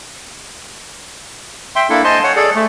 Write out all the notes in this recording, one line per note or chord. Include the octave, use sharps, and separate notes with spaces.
E5 G5 C6
A#3 D4 E4 A4
C5 D#5 G#5 A5 C6
C#5 F#5
G#4 A4 D5
A3